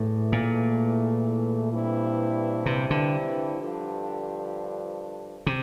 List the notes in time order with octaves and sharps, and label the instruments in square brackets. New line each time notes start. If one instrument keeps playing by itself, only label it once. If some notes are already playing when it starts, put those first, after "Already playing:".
Already playing: [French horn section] E2 E3 A3 [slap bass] A2
[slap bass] A#2
[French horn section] G2 E3 G3 C4 E4
[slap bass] C3
D3
[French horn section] G2 D3 F3
[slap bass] C3